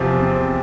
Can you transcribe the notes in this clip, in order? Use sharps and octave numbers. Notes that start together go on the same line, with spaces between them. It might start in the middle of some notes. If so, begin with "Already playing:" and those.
Already playing: E2 C3 F3
C4
C4